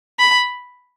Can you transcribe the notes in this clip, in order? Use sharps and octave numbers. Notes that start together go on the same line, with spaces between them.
B5